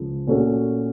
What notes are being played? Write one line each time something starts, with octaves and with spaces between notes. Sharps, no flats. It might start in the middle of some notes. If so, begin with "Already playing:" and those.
Already playing: C#2 C#3 F3
A#2 A3 C#4 F#4 A4